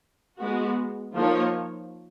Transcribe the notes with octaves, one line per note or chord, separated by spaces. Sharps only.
G#3 B3 F#4
F3 A#3 D#4 A#4 C#5